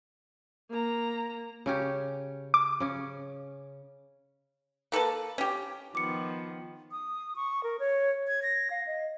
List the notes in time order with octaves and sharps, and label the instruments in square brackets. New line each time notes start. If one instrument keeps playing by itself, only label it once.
[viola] A#3 A#5
[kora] C#3 C#4 G4
[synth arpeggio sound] D6
[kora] C#3 C#4
[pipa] A#3 A4 B4 A5
C#4 G4
[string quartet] D#3 F3 B3 [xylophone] D6 C#7
[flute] D#6
C#6
A#4
C#5
G#6
A#6
F5
D#5